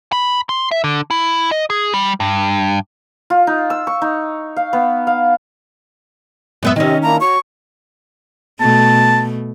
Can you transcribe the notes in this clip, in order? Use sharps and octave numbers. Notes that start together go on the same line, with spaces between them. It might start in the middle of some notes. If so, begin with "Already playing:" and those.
B5
C6
E5
D3
E4
D#5
G#4
G3
G2
F4
D#4
E6
C#6
D#4
F5
B3
F5
F#2 B3 E5
C3 D#3 C4 C#4 D#5
A#3 D4 E4 A#5
F#4 C#5 C#6
B2 A3 A5